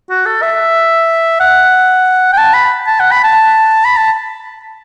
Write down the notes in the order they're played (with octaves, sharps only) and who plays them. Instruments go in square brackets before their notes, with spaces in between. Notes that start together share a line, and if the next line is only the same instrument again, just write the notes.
[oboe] F#4
A4
E5
F#5
G5
A5
B5
A5
F#5
B5
A5
B5
A5